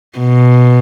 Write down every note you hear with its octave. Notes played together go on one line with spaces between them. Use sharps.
B2